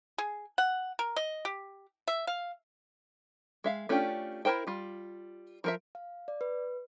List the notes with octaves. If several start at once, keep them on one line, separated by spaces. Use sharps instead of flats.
G#4
F#5
A#4
D#5
G4
E5
F5
G#3 E5 F5
A3 C#4 D4 F4 G4
E4 F#4 A#4 C5 G5
G3 F4
F3 A#4 E5
F5
D5
B4